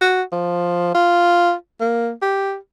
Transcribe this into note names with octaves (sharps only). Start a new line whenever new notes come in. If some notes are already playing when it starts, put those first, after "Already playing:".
F#4
F3
F4
A#3
G4